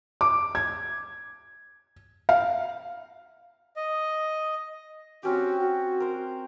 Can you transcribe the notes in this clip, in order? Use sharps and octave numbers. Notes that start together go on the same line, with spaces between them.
D6
G#6
F5
D#5
C4 C#4 F#4 G4
F#4
A#4 C5